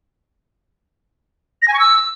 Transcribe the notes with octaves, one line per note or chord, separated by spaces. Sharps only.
A#6
G#5
C#6
E6